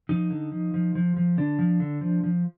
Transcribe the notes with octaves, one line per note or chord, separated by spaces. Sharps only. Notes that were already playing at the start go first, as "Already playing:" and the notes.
F3 D#4
D3
F3
F3
F3
F3
D3 D4
F3
D3
F3
F3